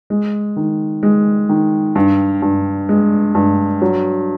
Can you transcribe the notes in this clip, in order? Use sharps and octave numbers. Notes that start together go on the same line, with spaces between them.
G#3
D#3
G#3
D#3
G2
G2
G#3
G2
F#3